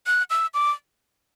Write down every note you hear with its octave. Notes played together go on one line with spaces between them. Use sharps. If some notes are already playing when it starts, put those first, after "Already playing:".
F#6
E6
D6